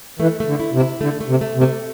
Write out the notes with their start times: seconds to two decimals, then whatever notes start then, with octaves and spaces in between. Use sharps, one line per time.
0.19 E3 A3
0.40 A3
0.47 D3
0.60 E4
0.73 C3
0.80 E4
1.01 D3 A3
1.21 A3
1.28 C3
1.41 A3
1.56 C3
1.61 A3